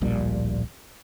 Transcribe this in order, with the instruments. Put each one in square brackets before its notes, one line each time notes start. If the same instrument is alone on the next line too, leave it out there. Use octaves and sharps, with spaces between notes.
[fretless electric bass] D1 A#1 A#2 G3